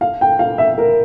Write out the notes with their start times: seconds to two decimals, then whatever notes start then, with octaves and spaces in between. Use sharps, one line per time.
0.01 F5
0.21 G5
0.39 F5
0.58 E5
0.78 A#4